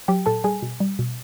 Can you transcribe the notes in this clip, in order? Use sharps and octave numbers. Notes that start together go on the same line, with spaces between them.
F#3 G4 G5
A#2 A4 A5
G3 G#4 G#5
B2
G3
B2